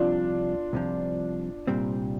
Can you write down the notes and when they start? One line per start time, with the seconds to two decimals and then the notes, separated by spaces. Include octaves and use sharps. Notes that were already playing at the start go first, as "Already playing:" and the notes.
Already playing: C2 C3 F3 D4 F4
0.73 C2 C3 F3
1.67 C2 A#2 G3 C4